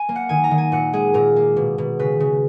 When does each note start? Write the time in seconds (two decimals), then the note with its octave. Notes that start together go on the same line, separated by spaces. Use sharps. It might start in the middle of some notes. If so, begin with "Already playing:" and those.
Already playing: G#5
0.09 A#3
0.16 F#5
0.29 D#3 G#5
0.44 A#5
0.51 D#3
0.58 G#5
0.72 A#2 F#5
0.93 G#3 G#4
1.14 A#2 A#4
1.36 A#3
1.56 B2
1.78 B2
1.99 C#3 B4
2.20 C#3